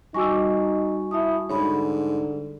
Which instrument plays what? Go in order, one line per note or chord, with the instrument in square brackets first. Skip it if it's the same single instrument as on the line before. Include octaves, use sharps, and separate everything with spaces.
[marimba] G3 D6 E6 [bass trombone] D#4 [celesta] F#4 G#5 C#6
[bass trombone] E4 [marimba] E5 A5 D#6
[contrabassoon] G#2 [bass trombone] D3 [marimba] C#5 B5